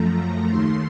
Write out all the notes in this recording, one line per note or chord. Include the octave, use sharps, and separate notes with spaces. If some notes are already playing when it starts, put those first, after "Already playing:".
Already playing: F#2 F3 A3 A#5
A#5
D#2 D#3 A3 C6